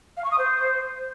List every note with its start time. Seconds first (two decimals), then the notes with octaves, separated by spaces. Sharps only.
0.17 F5
0.24 C#6
0.31 D#6
0.38 C5